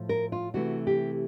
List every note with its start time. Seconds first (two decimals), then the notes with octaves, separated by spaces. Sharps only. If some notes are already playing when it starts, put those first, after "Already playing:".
Already playing: A2 F3
0.09 A#4
0.32 F4
0.54 C3 E3 A3 F#4
0.87 G4